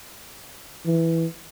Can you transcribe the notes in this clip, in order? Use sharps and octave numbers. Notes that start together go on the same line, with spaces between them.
E3